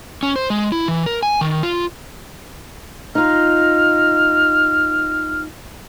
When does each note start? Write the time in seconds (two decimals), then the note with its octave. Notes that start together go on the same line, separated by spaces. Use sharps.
0.23 C#4
0.36 C5
0.50 G#3
0.72 E4
0.88 E3
1.06 A#4
1.23 G#5
1.41 D#3
1.63 F4
3.15 D#4 F4 F6